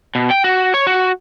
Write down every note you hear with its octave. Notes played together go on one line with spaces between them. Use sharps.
B2
G5
F#4
C#5
F#4